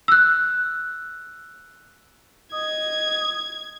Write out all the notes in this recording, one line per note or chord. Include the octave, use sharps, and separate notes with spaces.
E6 F#6
D#5 G#6